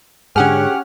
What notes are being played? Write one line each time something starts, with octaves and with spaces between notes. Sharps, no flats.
G#2 D3 C#4 G4 G#4 F#5 F6